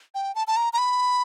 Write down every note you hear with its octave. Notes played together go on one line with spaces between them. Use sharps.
G5
A5
A5
A#5
A#5
B5